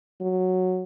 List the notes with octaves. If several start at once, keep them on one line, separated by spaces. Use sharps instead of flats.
F#3